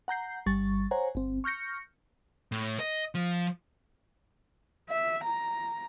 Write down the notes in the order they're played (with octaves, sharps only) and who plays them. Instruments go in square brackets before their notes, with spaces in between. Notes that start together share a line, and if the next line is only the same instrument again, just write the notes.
[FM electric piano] F#5 A#5 G6 C7
G1 G3 C#6 A6
C5 C#5 F#5 G#5 A#5
G1 C4
C#6 F6 G6 A#6 C#7
[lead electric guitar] A2
D#5
F3
[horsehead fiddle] E5
A#5